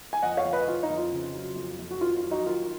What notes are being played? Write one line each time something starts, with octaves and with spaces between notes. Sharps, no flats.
G#5
F2 D#5 F#5
C#5 F5
F2
B4 D#5
F2 F4
D#4
F2
F4
C#3
F#3
F2
F2
F#4
D#3 F4
F4
F#3
D#4 F#4
D#3 F4